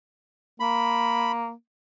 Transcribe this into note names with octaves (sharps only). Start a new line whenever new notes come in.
A#3 B5